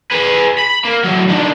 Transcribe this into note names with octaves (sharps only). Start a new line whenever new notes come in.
G#4 B4
B5
A#3
A2 F#3
D#3 D4